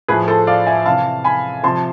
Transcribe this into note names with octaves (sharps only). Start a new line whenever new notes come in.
A2 F3 G#4 B4
A4 C5
D5 F5
E5 G#5
C3 E3 F5 A5
G#5 B5
C3 F3 A5 C6